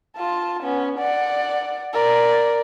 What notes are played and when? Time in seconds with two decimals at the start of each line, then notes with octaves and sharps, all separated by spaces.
0.16 F4 A5
0.63 B3 C#4
0.99 D5 F#5
1.93 A#4 D5